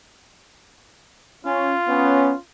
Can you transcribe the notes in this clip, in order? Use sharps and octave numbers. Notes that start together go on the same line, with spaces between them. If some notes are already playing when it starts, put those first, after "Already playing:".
C#4 F4
B3 C#4